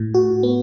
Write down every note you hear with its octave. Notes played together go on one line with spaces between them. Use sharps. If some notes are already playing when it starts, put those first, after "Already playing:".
Already playing: A2
F#4
B3